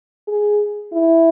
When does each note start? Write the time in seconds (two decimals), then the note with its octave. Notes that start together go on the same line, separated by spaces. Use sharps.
0.27 G#4
0.93 E4